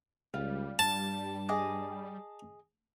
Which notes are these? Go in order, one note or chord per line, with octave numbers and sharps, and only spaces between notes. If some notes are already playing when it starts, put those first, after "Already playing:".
C#2 G3 F4
G2 A5
G#4 D#5 D6